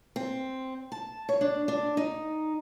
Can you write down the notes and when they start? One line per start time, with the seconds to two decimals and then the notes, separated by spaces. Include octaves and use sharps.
0.16 C4
0.92 A5
1.29 C#5
1.41 D4
1.68 D4
1.97 D#4